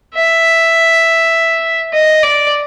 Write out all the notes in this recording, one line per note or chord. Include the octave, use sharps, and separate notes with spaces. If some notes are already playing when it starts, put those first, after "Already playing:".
E5
D#5
D5